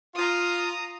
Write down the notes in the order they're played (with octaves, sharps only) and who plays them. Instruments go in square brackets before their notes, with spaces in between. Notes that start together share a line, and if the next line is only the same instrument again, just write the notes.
[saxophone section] F4 [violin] A#5 D#6